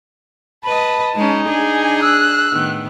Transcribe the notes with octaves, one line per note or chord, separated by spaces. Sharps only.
B4 D#5 A5 B5
G#3 C#4 D#4
D4 G#4 G#5
E6 F#6
A2 D#3 B3